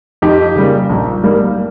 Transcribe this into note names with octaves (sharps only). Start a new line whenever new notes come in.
F2 D#4 G4
C#3 G3 A#3
A#1
G#2 G3 A#3